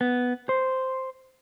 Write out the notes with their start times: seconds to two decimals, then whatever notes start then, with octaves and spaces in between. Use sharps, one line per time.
0.01 B3
0.49 C5